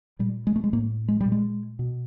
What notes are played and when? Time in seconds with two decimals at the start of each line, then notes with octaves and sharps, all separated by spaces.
0.19 A#2 G3
0.47 G#3
0.56 A3
0.64 G#3
0.73 A2 A#3
1.08 G#3
1.21 G3
1.26 A#2
1.32 G#3
1.79 B2